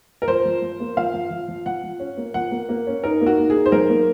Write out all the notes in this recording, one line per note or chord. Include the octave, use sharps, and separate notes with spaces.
A#4
F3 C5
F3
F3
A#3
F3 F5
F3
F3
F3
F3 F#5
F3
C#4
A#3
F3 F#5
A#3
A#3
C#4
D#4 A#4
A#3
F#4
D#4
G#4
D#4
C5
F#3 A#4
A#3